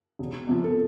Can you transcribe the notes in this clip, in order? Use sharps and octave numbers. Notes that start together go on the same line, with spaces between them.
E1
E2 C3 F3
A4